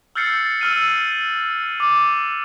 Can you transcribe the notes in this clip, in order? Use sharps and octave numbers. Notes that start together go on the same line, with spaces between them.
E6 F6 G6 A6 C7 C#7
E6 F6 D#7
D6